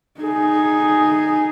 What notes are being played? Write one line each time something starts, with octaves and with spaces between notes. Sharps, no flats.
D#4 G#4